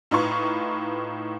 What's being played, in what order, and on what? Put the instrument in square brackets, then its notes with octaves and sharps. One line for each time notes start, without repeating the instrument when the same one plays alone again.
[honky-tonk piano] A2 D#4 F4 B4 C#6